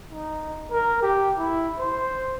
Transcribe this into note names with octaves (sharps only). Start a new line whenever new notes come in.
D#4
A#4
G4
E4
C5